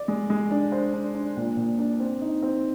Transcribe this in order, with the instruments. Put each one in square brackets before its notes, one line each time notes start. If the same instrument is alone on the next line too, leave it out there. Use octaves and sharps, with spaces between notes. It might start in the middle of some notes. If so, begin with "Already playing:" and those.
Already playing: [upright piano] D5
G#3
G#3
D4
C5
D4
D4
A#2
A#2
D4
C4
D#4
C4